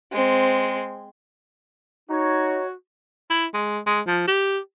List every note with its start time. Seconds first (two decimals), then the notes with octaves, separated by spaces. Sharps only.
0.12 G#3 C4
2.10 D#4 F#4 C#5
3.30 E4
3.54 G#3
3.87 G#3
4.07 F3
4.28 G4